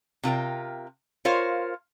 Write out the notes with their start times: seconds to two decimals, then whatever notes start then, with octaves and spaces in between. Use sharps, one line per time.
0.23 C3 F4 A#4 G5
1.25 F4 A#4 C5 C#5 F5